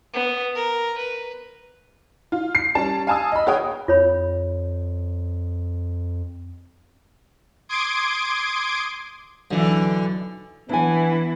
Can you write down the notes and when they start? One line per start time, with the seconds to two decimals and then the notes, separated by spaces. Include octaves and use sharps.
0.13 B3
0.55 A#4
0.97 B4
2.32 F4
2.55 C7
2.75 G3 C#4 A5
3.07 F5 G#5 A5 D#6 E6
3.32 D#5 B5
3.47 F#4 G#4 C#5 G5 D#6
3.88 F2 F4 C#5 B5
7.69 C6 D6 D#6 G#6 D7
9.51 B1 D3 E3
10.69 E3 B3 D4 E4 G#5